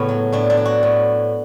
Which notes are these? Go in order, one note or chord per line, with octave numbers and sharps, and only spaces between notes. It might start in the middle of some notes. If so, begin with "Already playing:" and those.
Already playing: A2 C#3 B3 C#4
F#3
A2 D4
D4
F#3
F#4
A2